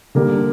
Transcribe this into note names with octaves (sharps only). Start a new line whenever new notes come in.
D3 G3 A#3